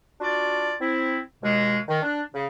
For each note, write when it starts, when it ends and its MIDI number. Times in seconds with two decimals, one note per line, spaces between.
0.20 0.73 62
0.20 0.73 65
0.20 0.73 66
0.20 0.73 74
0.79 1.18 60
0.79 1.18 64
1.43 1.79 39
1.43 1.79 47
1.43 1.79 56
1.88 2.02 51
2.02 2.22 62
2.34 2.47 49